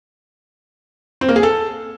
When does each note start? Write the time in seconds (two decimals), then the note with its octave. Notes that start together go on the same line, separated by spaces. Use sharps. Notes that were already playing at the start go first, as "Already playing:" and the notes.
1.21 C4
1.28 A#3
1.36 G#4
1.43 A4